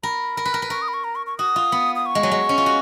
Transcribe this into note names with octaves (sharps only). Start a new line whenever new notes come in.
A#4 B5
A#4
B4
A#4
B4
A#4 C#6
D#6
B5
C#6
A#5
C#6
C#6
F#4 D#6
F4
B3
D#6
C#6
G#3
F#3
G#3
C#4
F4
F#4